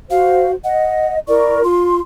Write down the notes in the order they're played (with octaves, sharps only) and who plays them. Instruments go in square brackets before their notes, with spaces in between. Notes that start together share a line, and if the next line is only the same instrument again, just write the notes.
[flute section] F#4 C5 [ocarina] F5
[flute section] D#5 [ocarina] F#5
[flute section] E4 A#4 C#6 [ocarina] D5
[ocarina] F4 [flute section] C6